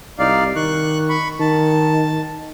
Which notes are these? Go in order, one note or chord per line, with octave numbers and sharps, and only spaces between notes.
C2 D#4 D5 F5
D#3 C#6 F#6
B5 C#6
D#3 A5